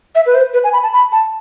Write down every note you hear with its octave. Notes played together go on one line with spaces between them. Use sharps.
E5
B4
C5
B4
G#5
B5
A5
B5
A5